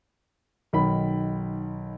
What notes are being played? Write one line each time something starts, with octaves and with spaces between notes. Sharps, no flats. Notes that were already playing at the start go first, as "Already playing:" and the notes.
B1 D#3 B5